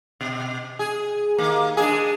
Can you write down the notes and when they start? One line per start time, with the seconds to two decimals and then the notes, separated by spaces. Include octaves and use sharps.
0.21 B2
0.79 G#4
1.38 D#2 A#3
1.77 G#3 D4 G#4